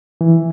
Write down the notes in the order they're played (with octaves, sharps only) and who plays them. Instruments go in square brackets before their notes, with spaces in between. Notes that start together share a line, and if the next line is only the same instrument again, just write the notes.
[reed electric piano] E3